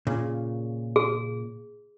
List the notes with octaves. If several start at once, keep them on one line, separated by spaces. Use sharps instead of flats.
A#2 C#3
G#4